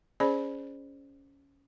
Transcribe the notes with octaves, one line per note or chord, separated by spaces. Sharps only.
C#4 G#4 C5 D5 B5